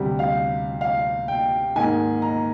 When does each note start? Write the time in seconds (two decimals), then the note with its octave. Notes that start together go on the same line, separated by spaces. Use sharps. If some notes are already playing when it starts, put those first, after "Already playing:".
Already playing: D2 C3 G3
0.19 F5
0.81 F5
1.28 G5
1.76 G#2 D#3 A#3 D#4 G#5
2.22 A#5